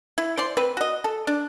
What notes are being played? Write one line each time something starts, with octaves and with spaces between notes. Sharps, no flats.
E4
C5 D5 C6
C4 B4
F#4 D#5
A4
D4